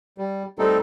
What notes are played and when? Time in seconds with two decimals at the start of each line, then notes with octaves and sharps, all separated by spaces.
0.18 G3
0.59 G3 A3 C4 D#4 A4